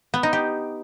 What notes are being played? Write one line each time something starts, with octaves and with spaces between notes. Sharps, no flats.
B3
D#4
G4